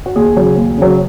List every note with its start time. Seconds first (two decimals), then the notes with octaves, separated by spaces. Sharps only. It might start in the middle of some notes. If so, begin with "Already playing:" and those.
0.06 F#4
0.16 D#2 G#4
0.37 C#3 F#3
0.57 D#2
0.78 C#3 F#3